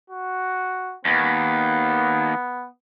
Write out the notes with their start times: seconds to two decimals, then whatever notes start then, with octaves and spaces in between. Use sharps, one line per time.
0.10 F#4
1.05 D#2 B3